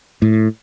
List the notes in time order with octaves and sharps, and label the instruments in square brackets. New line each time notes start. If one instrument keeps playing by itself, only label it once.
[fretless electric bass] A2